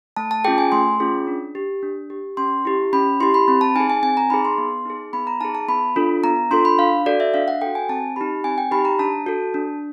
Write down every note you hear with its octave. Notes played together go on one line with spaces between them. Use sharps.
A3 A5
A5
C#4 F4 G#4 G5
G#5
A3 C6
C#4 F4 G#4
D4
G4
D4
G4
C#4 C6
E4 G4
C#4 B5
E4 G4 C6
B5
C4 B5
A5
D#4 G#4 G#5
G#5
C4 G#5
A#5
D#4 G#4 B5
C6
B3
D#4 G#4
B3 B5
A#5
D#4 G#4 A5
A5
B3 B5
D4 F4 A4
B3 A#5
D4 F4 A4 C6
B5
D4 F5
F#4 A4 D5
E5
D4 F5
F#5
F#4 A4 G5
G#5
C4 A5
D#4 G4 B5
C4 G#5
G5
D#4 G4 B5
A#5
D4 A5
F#4 A4
D4